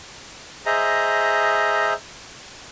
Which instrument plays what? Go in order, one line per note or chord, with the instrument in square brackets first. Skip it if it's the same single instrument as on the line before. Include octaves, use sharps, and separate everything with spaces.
[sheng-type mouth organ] G#4 C5 D#5 E5 A#5